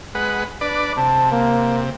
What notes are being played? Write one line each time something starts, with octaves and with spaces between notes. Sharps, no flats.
G#3 B4 F#5
D4 B4 D5
C3 A5
A#3